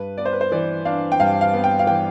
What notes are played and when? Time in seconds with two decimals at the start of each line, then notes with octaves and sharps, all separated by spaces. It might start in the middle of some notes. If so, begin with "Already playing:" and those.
Already playing: G2 B4
0.18 B3 D5
0.26 C5
0.33 B4
0.41 C5
0.52 E3 D5
0.85 D4 F5
1.12 G5
1.20 G2 F5
1.41 F5
1.54 B3
1.64 G5
1.79 F5
1.87 E3 G5